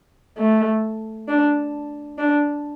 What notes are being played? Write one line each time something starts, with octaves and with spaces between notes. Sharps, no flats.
A3
D4
D4